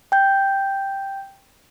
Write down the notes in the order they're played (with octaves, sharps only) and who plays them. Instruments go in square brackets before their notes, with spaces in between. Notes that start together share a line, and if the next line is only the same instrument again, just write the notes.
[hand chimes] G5 G6